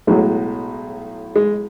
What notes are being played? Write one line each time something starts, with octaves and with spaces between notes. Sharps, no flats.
B1 A2 F#3 G#3
G#3